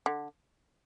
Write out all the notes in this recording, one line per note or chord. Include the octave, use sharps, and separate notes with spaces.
D3